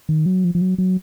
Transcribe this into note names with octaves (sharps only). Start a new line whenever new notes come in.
D#3
F#3
F3
F3
F#3
F#3